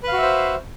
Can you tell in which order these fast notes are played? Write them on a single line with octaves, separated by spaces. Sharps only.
B4 F5 F#4 E5 C5